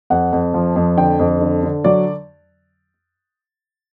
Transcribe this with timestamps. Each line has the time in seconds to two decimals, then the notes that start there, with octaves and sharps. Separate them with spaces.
0.10 F2 F#5
0.32 F2
0.54 F3
0.76 F2
0.97 D3 G5
1.19 F2
1.41 D3
1.63 D3
1.84 F#3 D5